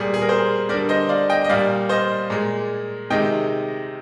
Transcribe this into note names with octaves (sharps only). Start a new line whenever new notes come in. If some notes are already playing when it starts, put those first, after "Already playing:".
Already playing: A#2 G3 G#4
G#4
A#4
G#4 C5
D3 G3 A#4 D5
C5 D#5
D5 F5
D#5 G5
D#5
A#2 G3 D5 F5
C5 D#5
A#2 G#3
C3 D#3 G#3 D#5 G5